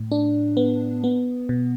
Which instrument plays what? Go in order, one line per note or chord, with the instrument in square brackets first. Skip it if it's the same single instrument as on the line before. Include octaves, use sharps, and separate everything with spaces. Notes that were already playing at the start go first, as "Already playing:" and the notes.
Already playing: [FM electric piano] A2
D4
B3
B3
B2